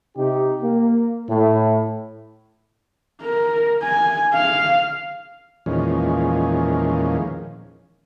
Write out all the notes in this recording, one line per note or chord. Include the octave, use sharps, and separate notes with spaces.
C3 D#4 G4
A#3
A2
A#4
G#5
F5
E2 A#2 D#3 F3 G#3 C#4